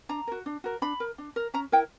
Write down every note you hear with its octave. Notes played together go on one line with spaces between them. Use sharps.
D4 A#5
F#4 A#4
D4
F#4 A#4
D4 B5
A#4
D4
A#4
C#4 A#5
E4 A#4 G5